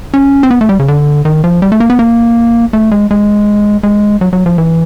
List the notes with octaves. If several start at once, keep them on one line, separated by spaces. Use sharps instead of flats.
C#4
C4
B3
A3
G3
C#3
D3
D#3
F3
G3
A3
A#3
B3
A#3
A3
G#3
G#3
G#3
F#3
F#3
F3
E3